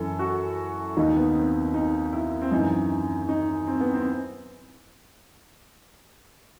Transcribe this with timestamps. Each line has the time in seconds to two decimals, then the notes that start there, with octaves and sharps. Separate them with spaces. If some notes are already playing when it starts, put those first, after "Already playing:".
Already playing: F#2 E3 A4
0.19 F#4
0.97 D#2 D#3 D#4
1.16 B3
1.35 C4
1.74 D#4
2.13 E4
2.42 C4
2.51 F#2 E3 D#4
3.29 D#4
3.67 C4
3.80 B3
3.94 C4